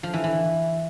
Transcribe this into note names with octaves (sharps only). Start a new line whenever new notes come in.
F3
E3
E3